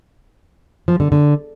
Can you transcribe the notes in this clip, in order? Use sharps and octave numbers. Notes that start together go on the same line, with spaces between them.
F3
D3
D3